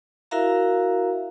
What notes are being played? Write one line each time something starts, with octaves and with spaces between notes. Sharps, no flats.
E4 F#4 A#4 E5 F5 A#5